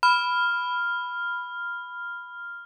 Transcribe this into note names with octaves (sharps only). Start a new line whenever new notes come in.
B5 F6